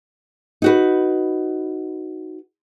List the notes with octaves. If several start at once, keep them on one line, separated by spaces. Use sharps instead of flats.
D#4 F#4 B4